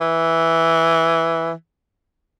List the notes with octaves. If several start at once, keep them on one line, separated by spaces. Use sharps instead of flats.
E3